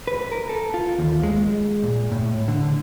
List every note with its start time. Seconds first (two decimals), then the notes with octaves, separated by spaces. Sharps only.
0.07 B4
0.32 A#4
0.49 A4
0.74 F4
0.99 D#2
1.23 G#3
1.83 A#2
2.12 A2
2.48 D3